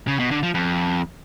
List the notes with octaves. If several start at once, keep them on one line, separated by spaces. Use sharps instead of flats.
C#3
B2
D3
F3
F2